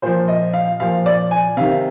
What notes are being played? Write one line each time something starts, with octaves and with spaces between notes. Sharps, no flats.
A#2 F3 C5
D#5
F5
A#2 F3 F5
D5
G#5
C3 D#3 F5